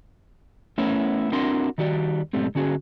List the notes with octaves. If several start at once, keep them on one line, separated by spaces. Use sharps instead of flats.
A3 B3 C#4 E4 A#4 C#5
C4 D4 E4 F#4 A#4 C6
D#3 G3 F#4 D5
B1 G#2 G3 A3 C4
D3 C#4 F#4 G#4